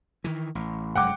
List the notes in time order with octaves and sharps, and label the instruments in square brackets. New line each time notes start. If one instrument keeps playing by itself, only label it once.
[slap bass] D#3 E3
A1
[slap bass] F1 F#2 G#3 [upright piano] F#5 G5 D6